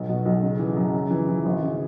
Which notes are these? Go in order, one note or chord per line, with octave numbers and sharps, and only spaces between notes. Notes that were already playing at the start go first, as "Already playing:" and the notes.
Already playing: B1 F#3
B2
B1
C#3
E3
F#2
C#3
E3
E3
G#1
C#3